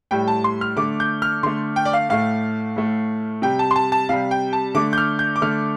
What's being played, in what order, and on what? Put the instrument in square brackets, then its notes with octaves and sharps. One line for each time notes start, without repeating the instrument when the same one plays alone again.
[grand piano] A2 G3 G5
A5
C6
F6
D3 A3 D6
G6
F6
D3 A3 C6
G5
D5
F5
A2 A3 F5
A2 A3
C3 G3 G5
A5
C6
A5
A5
C3 G3 F5
G5
A5
D3 A3 D6
G6
F6
G6
D6
D3 A3 F6